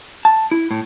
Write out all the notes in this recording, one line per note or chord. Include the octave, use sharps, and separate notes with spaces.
A5
E4
A2